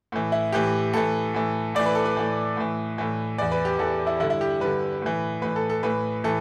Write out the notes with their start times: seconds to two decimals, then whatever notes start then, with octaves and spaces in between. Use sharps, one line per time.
0.12 A2 E3
0.32 E4
0.52 A2 E3 G4
0.93 A2 E3 A4
1.34 A2 E3
1.75 A2 E3 D5
1.86 B4
1.95 A4
2.05 B4
2.17 A2 E3
2.57 A2 E3
2.98 A2 E3
3.38 E2 E3 D5
3.51 B4
3.65 G4
3.79 E2 E3 A4
4.07 E4
4.20 G2 D3 E4
4.30 E4
4.41 G4
4.60 G2 D3 B4
5.02 A2 E3
5.42 A2 E3 B4
5.56 A4
5.70 A4
5.83 A2 E3 B4
6.24 A2 E3 A4